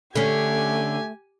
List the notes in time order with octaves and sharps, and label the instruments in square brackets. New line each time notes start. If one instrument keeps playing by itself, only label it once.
[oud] D3 C#4 [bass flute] A3 [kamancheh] G4 G#5